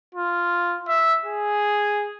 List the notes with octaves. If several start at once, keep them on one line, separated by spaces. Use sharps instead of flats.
F4
E5
G#4